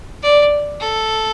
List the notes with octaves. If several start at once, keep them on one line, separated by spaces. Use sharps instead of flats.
D5
A4